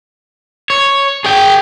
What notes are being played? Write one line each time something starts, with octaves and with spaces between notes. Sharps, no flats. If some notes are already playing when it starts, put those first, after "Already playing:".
C#5
G#4 G5